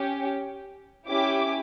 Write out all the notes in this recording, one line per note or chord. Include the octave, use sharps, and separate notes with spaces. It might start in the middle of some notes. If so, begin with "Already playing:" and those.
Already playing: C#4 G4
C#4 E4 G4 D6